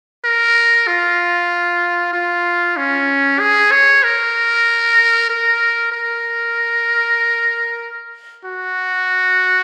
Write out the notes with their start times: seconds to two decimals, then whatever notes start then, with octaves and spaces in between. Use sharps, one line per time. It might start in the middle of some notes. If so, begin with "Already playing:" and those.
0.24 A#4
0.87 F4
2.13 F4
2.77 C#4
3.40 G#4
3.71 C#5
4.04 A#4
5.30 A#4
5.92 A#4
8.45 F#4